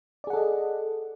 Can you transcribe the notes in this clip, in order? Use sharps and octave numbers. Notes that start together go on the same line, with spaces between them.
G#4 A4 D5 D#5 F#5